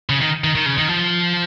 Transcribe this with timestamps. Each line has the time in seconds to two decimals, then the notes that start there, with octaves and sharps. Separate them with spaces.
0.09 C#3
0.21 D#3
0.44 D#3
0.55 D#3
0.66 C#3
0.78 D#3
0.89 F3